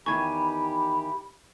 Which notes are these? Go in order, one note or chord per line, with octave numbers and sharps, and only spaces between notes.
E2 D#3 G4 G#5 B5 C#6 G#6